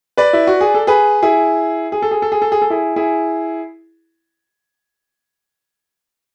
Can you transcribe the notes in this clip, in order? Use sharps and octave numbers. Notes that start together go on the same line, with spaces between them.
B4 D5
E4
F#4
G#4
A4
G#4 B4
E4 G#4
G#4
A4
G#4
A4
G#4
A4
G#4
A4
E4 G#4
E4 G#4